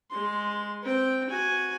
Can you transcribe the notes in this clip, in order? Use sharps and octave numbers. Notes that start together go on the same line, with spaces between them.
G#3 C6
C4 G5
F#4 G#5